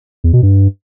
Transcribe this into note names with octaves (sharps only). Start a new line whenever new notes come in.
E2
B2
G2